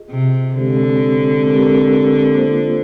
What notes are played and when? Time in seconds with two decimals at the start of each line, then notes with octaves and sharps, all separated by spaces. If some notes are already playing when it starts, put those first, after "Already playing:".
Already playing: F4 G#4 D#5
0.10 C3
0.54 D3 G#3 C4 G4 C5
1.44 G#3 C4 G4 A#4
2.33 A#3 F4 C5